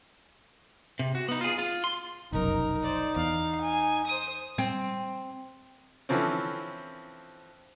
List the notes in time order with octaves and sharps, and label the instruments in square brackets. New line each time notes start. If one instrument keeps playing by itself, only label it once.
[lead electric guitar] C3
F#4
B3 D#4
F4 G#4
F4
C6
[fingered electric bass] F1 B1 F#2 [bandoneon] D#4 [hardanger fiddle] A#4
[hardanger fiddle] C5 D5
[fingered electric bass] E2 [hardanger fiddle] F5
[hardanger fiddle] G#5
C5 D#6
[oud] C4
[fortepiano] D3 E3 F3 C4 C#4